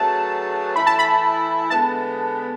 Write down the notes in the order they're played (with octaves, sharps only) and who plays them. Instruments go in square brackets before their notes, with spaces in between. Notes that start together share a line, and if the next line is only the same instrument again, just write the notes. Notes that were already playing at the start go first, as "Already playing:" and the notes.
Already playing: [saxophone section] F#3 A3 C#4 G#4 B4 [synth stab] A5
[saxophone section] E3 A3 E4 [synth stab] B5
[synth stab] A5
B5
[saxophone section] D3 G#3 B3 [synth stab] A5